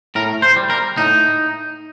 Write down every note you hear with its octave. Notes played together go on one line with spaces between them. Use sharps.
A2 A#4
C5
G3
A#4
A2 D#4